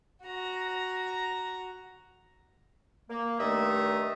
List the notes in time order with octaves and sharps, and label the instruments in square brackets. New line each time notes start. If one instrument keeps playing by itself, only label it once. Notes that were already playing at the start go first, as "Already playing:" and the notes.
[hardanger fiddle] F#4 A#5
[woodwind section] A#3
G2 D#3 A3 E5 A#5 D#6